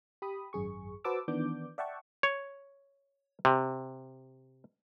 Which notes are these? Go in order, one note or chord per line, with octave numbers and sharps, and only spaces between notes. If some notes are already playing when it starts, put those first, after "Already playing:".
G4 B5 D#6
G#1 F#2 G#4 C#6
F#4 B4 C5 A5 D6 E6
D#3 E3 B3 D4 D6 G6
D5 E5 F#5 G5 A5 C#6
C#5
C3